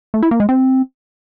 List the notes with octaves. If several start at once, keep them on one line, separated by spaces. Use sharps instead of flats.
A3
E4
A#3
G#3
C4